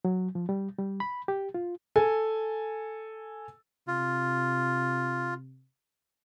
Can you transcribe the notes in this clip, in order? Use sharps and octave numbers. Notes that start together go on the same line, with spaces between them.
F#3
F3
G3
G3
B5
G4
F4
A4 G#5
C3 F4